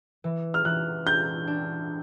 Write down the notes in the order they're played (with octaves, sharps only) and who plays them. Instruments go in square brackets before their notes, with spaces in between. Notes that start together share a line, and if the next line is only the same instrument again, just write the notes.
[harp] E3
[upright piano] F6
[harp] E3 [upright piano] F#6
[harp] D4 [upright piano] G6
[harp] D4